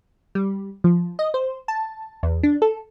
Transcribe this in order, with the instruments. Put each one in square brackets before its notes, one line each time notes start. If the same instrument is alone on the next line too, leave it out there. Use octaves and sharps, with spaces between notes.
[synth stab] G3
F3
D#5
C5
A5
E2
D4
A4